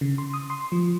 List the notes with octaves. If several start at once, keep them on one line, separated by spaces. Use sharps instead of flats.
C#3
C6
D#6
C6
F3